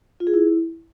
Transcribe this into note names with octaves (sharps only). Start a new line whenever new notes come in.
F4
G#4
E4